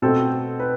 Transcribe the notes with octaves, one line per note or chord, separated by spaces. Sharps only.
B2 A3 C4 A4
B4